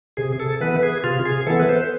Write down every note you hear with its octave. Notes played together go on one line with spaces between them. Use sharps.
C3 G#4
A4
E3 B3 B4
G#4
C3 F4
G#4
E3 B3 A4
B4
C5